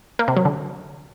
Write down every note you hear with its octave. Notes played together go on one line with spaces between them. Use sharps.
A#3
C3
F#3
D3